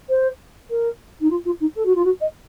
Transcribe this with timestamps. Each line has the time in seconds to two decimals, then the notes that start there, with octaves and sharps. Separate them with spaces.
0.09 C5
0.70 A#4
1.20 D#4
1.30 F4
1.45 F4
1.60 D#4
1.75 A4
1.85 F#4
1.95 F4
2.04 F#4
2.20 D#5